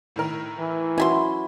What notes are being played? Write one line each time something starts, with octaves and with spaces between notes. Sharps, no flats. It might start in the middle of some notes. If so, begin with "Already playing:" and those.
A2 D#3 A#4
E3
C#4 E4 F#4 G#5 C6